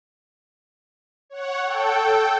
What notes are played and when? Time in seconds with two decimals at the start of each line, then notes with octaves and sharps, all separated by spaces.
1.30 C#5 F#5
1.65 A4 G5